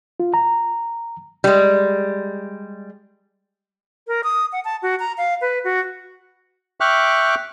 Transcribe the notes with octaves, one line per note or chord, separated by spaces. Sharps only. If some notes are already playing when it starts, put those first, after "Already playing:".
F4
A#5
G3 G#3
A#4
D#6
F#5
A5
F#4
A#5
F5
B4
F#4
E5 G5 C#6 D6 F6 F#6